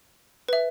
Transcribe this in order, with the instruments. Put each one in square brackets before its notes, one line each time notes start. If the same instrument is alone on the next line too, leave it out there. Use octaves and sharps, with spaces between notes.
[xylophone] B4 E5